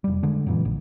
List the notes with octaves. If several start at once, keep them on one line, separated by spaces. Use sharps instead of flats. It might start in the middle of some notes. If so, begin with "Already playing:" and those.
F1 G3
D3 G#3
F#2 A#2 E3
A#1